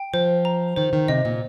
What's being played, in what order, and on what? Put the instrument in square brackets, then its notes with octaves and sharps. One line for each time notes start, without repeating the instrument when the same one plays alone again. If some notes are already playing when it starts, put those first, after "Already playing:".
Already playing: [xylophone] G5
[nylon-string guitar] F3 [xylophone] C5
[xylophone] A#5
[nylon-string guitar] D#3 [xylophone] C5
[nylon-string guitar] D#3
[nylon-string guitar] C3 [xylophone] D#5
[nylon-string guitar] A#2